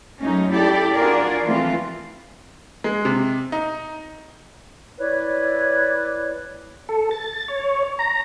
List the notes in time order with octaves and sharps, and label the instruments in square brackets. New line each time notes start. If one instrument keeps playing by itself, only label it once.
[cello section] F#2 F#3 A3 C#4 D#4
E4 G4 A4 D5
D4 F4 F#4 G#4 A#4 D5
E3 F3 A3 C4 F4
[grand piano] G#3
C3
D#4
[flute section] E4 B4 C#5 D5
[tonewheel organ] A4
A6
C#5
A#5